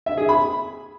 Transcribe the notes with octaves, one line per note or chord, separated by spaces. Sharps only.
E5
G#4
B5